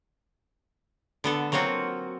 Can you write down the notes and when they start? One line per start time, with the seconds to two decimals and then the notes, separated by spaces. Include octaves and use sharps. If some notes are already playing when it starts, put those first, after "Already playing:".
1.24 D3 B3 A4
1.52 F#3 A#3 C4 F4 F#4